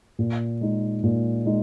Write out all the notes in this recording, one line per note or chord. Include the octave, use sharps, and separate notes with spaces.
A#2
G#3 D#4
A#2
G#3 D#4